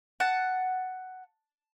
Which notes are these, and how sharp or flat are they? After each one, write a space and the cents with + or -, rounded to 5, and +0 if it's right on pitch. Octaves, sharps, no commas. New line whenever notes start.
F#5 +5 A5 +0